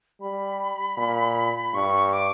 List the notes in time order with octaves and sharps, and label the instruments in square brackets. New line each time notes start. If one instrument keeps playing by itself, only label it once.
[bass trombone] G3 [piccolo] B5
[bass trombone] A#2
[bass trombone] G2 [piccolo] C#6
[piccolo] D6